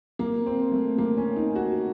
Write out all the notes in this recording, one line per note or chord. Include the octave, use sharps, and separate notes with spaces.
A#3
C4
A3
A#3
C#4
D#4
F#4